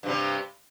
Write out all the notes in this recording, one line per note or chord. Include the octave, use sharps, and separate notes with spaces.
G2 C3 G3